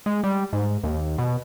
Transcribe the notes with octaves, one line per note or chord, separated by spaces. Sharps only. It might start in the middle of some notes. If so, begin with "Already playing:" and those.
G#3
G3
G#2
D#2
B2